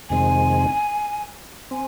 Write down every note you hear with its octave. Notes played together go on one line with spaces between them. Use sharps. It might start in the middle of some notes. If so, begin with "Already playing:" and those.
F2 C3 D#3 G#3 C4 G#5
C4 G#5